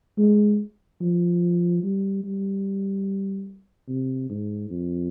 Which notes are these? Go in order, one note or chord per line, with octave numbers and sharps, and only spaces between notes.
G#3
F3
G3
G3
C3
G#2
F2